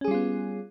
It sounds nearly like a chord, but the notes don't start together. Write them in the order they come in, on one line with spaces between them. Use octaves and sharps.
C#4 G#4 G3 F4 B3